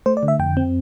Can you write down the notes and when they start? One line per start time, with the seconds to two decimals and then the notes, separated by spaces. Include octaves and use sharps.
0.06 A3 C5
0.17 D5
0.23 D3
0.28 E5
0.39 F2 G5
0.57 C4